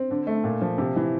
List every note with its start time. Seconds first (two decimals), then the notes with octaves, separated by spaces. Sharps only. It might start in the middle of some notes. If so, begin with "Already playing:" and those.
Already playing: C4
0.11 D3
0.27 A3
0.44 A#2
0.61 F3
0.78 C3
0.96 E3